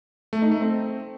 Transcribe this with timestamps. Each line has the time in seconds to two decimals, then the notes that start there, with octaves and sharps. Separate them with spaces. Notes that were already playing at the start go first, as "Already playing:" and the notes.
0.33 A3
0.42 D#4
0.52 A3
0.61 C4